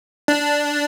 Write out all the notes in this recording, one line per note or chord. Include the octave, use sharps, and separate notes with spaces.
D4